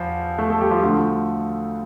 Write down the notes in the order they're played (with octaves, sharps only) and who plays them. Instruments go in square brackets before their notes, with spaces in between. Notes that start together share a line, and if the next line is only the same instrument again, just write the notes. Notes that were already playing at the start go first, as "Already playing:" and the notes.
Already playing: [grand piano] E2 F3
A3 A4
A3 A4
G3 G4
F3 F4
D2 D3 F3 A3